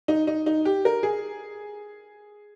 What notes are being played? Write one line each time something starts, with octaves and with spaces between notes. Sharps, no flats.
D#4
D#4
D#4
G4
A#4
G#4